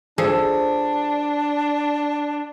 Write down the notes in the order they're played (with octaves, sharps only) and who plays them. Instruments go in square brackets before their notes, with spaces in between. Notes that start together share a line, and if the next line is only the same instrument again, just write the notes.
[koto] F3 G#4 A4 [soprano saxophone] D4